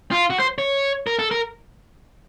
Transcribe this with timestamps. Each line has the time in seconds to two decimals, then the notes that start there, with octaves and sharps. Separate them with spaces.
0.12 F4
0.30 F#4
0.39 C5
0.58 C#5
1.07 A#4
1.19 A4
1.31 A#4